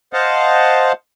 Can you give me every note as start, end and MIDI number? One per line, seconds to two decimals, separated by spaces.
0.13 0.92 72
0.13 0.92 75
0.13 0.92 77
0.13 0.92 78
0.13 0.92 81